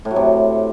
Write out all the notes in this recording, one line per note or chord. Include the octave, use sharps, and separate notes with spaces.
A2
F#3
C3